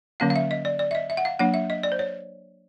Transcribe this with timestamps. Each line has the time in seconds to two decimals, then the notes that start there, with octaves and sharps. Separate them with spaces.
0.20 D3 F#3 A#3 C#4 F5
0.30 F5
0.36 E5
0.51 D#5
0.65 D5
0.79 D5
0.91 E5
0.95 D#5
1.10 E5
1.17 F#5
1.25 F5
1.39 F#3 A#3 D4 F#5
1.54 E5
1.70 D#5
1.83 D5
1.92 C5
1.99 C#5